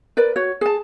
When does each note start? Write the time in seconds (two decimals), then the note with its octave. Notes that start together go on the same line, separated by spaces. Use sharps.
0.17 A#4 B4 D5
0.36 F#4 C#5
0.61 G#4 A5